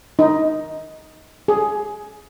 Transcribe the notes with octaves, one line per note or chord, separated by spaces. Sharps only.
D#4
G#4